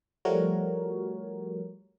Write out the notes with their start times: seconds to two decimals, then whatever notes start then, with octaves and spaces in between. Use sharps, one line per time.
0.25 F3 G3 A3 F#4 A#4 C#5